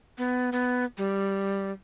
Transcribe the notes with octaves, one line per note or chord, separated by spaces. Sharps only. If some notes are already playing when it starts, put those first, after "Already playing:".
B3
B3
G3